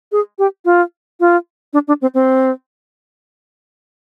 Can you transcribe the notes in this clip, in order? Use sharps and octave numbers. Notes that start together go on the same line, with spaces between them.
G#4
G4
F4
F4
D4
D4
C4
C4